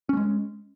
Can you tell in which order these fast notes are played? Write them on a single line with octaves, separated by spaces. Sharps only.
C#4 A3 G#3